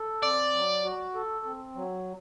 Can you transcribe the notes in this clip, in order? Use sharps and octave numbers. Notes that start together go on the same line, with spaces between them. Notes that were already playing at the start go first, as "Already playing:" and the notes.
Already playing: A4
C4 D5
F#3
F#4
A4
C4
F#3